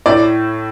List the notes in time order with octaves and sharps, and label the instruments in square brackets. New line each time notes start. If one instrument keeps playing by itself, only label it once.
[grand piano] A2 [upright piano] D5